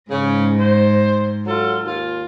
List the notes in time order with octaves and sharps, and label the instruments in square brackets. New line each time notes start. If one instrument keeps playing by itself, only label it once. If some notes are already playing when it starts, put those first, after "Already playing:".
[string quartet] G#2 [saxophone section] C#3
[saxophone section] C5
F#3 F4 A4
D#2 F4